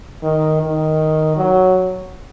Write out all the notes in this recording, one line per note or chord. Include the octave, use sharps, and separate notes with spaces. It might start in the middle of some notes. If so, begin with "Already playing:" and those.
D#3
D#3
F#3